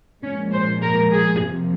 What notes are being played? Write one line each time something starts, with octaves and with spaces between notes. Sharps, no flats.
A#2 F3 G#3 C#4
C5
A#4
G#4
F2 C3 F3 A#3